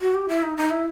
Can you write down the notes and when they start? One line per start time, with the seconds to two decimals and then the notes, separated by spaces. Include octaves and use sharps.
0.01 F#4
0.14 G4
0.29 E4
0.43 D#4
0.57 D#4
0.70 E4